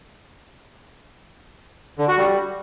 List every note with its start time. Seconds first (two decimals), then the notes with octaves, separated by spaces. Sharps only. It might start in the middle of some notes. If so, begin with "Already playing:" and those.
1.99 D3
2.08 F#4
2.17 G3